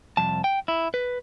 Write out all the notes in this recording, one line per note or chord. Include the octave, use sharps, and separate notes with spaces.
C2 F2 A5
G5
E4
B4